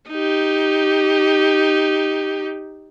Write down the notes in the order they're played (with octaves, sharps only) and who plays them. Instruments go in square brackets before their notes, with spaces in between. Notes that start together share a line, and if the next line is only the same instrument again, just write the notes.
[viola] D#4 G4